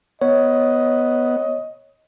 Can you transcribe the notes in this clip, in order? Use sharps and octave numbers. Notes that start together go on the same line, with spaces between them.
B3 C#5 D#5